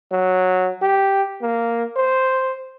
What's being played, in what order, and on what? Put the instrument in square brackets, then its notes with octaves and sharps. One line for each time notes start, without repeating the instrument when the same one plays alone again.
[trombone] F#3
G4
A#3
C5